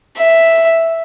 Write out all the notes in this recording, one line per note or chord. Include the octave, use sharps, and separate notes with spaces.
E5